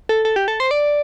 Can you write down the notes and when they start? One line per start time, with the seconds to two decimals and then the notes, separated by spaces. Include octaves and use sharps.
0.09 A4
0.25 A4
0.36 G4
0.48 A4
0.60 C5
0.71 D5